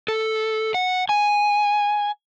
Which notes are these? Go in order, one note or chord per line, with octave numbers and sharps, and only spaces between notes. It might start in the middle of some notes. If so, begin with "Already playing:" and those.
A4
F#5
G#5